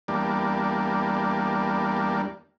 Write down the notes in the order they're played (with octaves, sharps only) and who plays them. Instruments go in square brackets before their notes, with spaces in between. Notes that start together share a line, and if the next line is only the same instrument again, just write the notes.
[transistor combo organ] E2 G3 A#3 D4